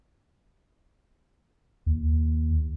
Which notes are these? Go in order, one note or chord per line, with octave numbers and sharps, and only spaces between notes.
D#2